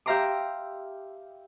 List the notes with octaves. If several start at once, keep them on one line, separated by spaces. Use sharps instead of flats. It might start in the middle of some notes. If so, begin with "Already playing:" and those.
G4 E5 F5 A#5 C6 D6